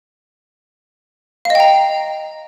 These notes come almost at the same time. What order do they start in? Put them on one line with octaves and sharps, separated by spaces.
F5 D#5 G5 A#5